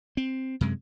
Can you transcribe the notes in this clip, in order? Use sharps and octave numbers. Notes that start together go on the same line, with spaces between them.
C4
F#2 C3 G#3